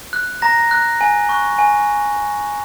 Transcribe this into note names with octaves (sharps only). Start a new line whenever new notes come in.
F#6
A#5 A#6
F#6
G#5
C#6 F#6
G#5